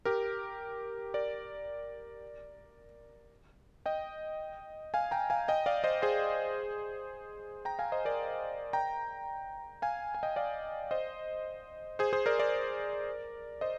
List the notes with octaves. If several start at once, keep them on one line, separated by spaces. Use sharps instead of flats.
G4 A#4
A#4 D5
D#5 G5
F5 G#5
G5 A#5
F5 G#5
D#5 G5
D5 F5
C5 D#5
G#4 C5
G5 A#5
F5 G#5
C5 D#5
A#4 D5
G5 A#5
F5 G#5
G#5
D#5 G5
D5 F5
C5 D#5
G#4 C5
G#4 C5
A#4 D5
A#4 D5
C5 D#5